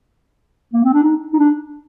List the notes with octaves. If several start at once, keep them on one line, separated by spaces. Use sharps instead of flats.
A#3
C4
D4
D#4
D#4
D4